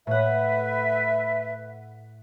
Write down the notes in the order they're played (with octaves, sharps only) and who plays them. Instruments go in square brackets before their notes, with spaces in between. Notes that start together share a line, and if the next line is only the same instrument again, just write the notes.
[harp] A2 F#5 [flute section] B4 E5